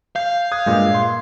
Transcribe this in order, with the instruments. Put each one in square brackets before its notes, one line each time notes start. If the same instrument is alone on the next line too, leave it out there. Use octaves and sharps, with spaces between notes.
[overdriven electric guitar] F5 [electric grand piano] G6
[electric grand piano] D#6 F#6 G#6
G2 A#2 G#3
C6